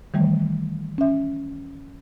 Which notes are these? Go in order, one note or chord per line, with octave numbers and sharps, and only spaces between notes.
D#3 E3 G3 A3
C#4 E5